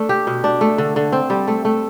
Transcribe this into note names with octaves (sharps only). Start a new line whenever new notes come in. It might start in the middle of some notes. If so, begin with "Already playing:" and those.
Already playing: A3 D4
G4
B2
D4
A3
D3
D3
C4
G3
A3
A3